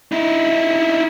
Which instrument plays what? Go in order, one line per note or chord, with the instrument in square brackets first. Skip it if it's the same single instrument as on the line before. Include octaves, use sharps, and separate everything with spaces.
[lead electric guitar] D#4 E4